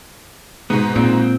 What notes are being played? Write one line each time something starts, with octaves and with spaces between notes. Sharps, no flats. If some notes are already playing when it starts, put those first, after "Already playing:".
G#2 B2 B3
A#2 C4